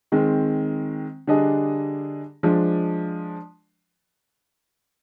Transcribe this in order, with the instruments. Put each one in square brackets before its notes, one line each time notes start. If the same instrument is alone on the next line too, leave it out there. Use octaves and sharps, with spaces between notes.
[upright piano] D#3 G#3 C4
D3 G3 D4 G#4 D#5
F3 G#3 D4